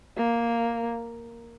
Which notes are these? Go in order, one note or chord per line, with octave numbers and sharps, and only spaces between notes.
A#3